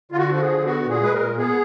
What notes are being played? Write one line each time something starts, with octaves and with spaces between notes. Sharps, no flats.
D3 F4
F#4
F3
F#4
G#4
D3
B3 F#4
A#2
G#4
G#3 B4
A#4
A#2
B3 G#4